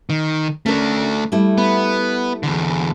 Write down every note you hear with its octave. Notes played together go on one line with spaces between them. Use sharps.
D#3
A3 C#4 D4 A#4
G3 A3 E4
B3
E2 D3